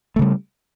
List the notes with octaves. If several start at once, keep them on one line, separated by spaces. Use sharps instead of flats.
C#3 G3 A3